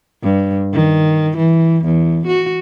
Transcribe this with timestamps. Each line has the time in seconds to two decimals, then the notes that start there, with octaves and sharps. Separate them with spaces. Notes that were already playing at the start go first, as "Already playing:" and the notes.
0.24 G2
0.73 D#3
1.37 E3
1.85 E2
2.27 F#4